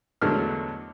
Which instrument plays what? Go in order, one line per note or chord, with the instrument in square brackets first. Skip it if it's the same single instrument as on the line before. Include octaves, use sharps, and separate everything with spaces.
[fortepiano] E2 D3 F#3 G#3 A3 F6